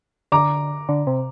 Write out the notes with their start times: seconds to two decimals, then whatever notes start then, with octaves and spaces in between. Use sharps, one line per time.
0.32 D3 A#5 D6
0.89 D3
1.07 C3